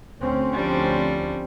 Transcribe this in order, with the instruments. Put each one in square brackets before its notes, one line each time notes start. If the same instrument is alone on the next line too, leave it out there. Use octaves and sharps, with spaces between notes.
[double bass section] D2 C4 C#4
[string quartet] F3 G3 D4